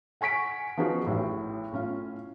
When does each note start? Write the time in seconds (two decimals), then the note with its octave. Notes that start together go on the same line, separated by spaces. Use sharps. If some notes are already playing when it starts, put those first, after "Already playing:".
0.21 F#5 G#5 C#6 B6 D7
0.77 F3 B3 C#4 D#4 F#4 G#4
1.06 A1 A2
1.72 A2 C#4 F4